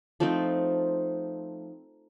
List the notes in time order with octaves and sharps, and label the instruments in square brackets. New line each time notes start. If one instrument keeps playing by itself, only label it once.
[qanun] F3 A3 C4 D#4